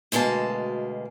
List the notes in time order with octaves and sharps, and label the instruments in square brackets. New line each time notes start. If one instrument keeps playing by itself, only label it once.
[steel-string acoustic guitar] D2 B2 G#3 A#3 A5